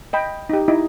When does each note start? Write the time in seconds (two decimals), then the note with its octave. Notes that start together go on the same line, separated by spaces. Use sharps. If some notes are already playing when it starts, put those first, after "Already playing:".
0.13 D#5 G5 B5
0.49 D#4 G4
0.68 D#4 E4 D#5